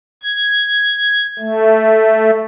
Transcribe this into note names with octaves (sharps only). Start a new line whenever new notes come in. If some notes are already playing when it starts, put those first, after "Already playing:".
G#6
A3